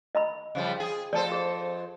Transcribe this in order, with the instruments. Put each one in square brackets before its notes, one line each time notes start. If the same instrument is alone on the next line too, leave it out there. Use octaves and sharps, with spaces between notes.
[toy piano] D#5 A#5 B5
[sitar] C#3 F3 G3
G#4
[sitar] F2 A4 C5 [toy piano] D5 A5
[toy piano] G#4